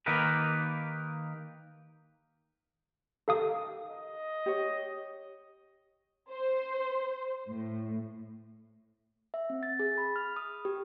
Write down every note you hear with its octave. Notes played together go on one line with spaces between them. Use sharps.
D#3 A#3 D#4 G4 A#4 B4
D#4 G4 A4 A#4 F5 D#6
D#5
G4 C#5
C5
A2
E5
C4
A6
G#4
B5
F6
D#6
G4